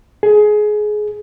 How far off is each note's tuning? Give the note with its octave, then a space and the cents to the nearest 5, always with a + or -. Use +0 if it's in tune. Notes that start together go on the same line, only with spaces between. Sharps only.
G#4 +20